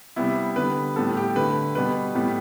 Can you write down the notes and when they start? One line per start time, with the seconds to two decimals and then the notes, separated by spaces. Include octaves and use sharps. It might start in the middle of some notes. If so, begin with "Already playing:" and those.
0.16 C3 G3 B3 E4
0.56 D3 G3 B3 B4
0.96 A2 G3 B3 A4
1.17 G4
1.36 D3 A3 B4
1.75 B2 G3 B3 B4
2.15 A2 G3 B3